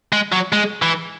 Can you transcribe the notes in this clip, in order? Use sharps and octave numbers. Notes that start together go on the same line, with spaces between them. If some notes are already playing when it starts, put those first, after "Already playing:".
G#3
F#3
G#3
E3